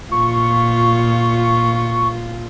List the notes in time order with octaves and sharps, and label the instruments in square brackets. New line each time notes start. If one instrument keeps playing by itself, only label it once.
[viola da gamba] A#2 F4 [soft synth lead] C#6